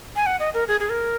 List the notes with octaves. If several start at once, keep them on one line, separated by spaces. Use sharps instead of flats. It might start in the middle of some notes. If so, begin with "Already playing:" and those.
G#5
F#5
D#5
A#4
G#4
G#4
A#4